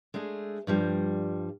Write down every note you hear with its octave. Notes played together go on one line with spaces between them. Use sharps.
G#3 A3 D4 G#4
G2 F3 G3